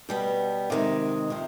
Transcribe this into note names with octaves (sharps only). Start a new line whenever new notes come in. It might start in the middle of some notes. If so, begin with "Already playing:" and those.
B2 G3 B3
C3 D#3 G#3
C3 F3